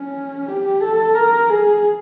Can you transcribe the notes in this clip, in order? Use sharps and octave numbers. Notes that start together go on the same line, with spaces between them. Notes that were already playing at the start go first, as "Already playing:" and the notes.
Already playing: C#4
G4
A4
A#4
G#4